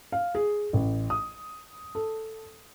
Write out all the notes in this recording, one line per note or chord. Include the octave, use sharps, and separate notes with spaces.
F5
G#4
A1
D#6
A4